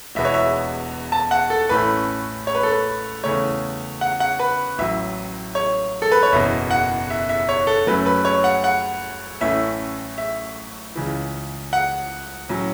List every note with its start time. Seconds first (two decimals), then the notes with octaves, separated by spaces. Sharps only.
0.15 E1 E2 B2 B3 E5
0.25 C#5
0.34 E5
1.12 A5
1.31 F#5
1.50 A4
1.69 A1 A2 A3 C#4 B4
2.47 C#5
2.55 B4
2.63 A4
2.72 B4
3.24 E2 C#3 A3 C#5
4.01 F#5
4.20 F#5
4.39 B4
4.78 A1 A2 F#3 E5
5.55 C#5
6.02 A4
6.12 B4
6.23 C#5
6.32 F#1 E2 B2 E5
6.71 F#5
7.10 E5
7.29 E5
7.49 C#5
7.67 A4
7.87 F#2 F#3 A3 C#4 B4
8.06 B4
8.25 C#5
8.44 F#5
8.64 F#5
9.41 A1 A2 A3 C#4 E5
10.18 E5
10.96 C#2 C#3 E3
11.73 F#5
12.49 A2 F#3 C#4